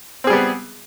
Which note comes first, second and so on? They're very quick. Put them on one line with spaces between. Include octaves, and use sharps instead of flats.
C4 G#4 G3 B3